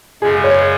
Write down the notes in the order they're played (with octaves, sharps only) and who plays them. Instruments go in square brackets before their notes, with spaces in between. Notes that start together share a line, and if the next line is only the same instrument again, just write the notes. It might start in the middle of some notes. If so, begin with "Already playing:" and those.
[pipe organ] F#2 C#3 G#3 [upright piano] G#4
[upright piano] C#5